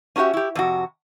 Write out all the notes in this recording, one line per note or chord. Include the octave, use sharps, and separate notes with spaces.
C#4 D4 F#4 G4 E5
E4 G4
F2 C3 F#4